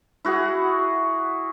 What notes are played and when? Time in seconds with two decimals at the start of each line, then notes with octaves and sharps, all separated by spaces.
0.25 E4 F#4 G#4 F#5